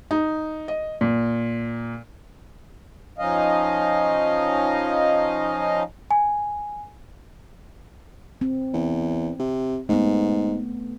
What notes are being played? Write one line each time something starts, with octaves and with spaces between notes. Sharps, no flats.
D#4
D#5
A#2
F3 C#4 D#4 D#5 F5
G#5
C4
E2
C3
G#2 A3 B3